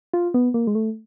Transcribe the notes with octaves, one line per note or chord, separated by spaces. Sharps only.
F4
B3
A#3
G#3
A3